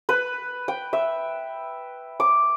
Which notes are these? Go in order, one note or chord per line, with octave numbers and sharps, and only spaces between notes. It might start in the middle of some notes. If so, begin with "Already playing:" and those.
B4
G5
E5
D6